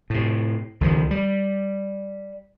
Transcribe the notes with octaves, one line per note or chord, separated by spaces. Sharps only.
A2 C3
C#2 D#3 F3
G3